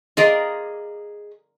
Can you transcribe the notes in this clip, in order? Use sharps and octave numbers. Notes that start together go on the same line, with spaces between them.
F4 G#4 A#4 D5 D#5 A#5